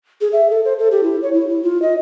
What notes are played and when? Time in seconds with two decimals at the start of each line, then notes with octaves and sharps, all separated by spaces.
0.21 G#4
0.33 E5
0.50 A4
0.65 C5
0.79 A4
0.91 G4
1.03 E4
1.22 C#5
1.33 E4
1.50 E4
1.63 F4
1.82 D#5